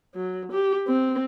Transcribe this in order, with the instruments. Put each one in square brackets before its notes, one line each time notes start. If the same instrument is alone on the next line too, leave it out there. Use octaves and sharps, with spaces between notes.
[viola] F#3
G4
C4